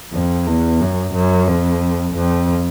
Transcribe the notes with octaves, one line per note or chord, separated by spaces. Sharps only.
F2
E2
F#2
F#2
F2
F2